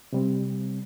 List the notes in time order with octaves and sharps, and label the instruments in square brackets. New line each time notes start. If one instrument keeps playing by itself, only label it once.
[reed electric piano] C3 G3 C4